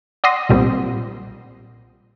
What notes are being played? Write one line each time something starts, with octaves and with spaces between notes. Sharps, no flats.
D5 F#5 C6 D#6 A#6
B1 A#2 G3 C4